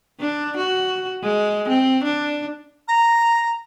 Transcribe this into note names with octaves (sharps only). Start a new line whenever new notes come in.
D4
F#4
G#3
C4
D4
A#5